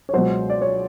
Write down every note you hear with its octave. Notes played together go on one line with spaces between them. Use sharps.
C#5
C#2 B2 F#3 C5
D5
C#5